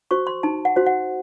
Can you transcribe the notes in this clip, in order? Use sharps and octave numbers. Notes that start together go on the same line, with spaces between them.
F#4 C5 C#6
C6
D#4 A5
F#5
F#4 C5
F#5